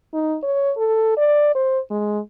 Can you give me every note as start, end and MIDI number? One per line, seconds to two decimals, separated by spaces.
0.14 0.37 63
0.43 0.72 73
0.77 1.16 69
1.18 1.53 74
1.55 1.79 72
1.91 2.19 56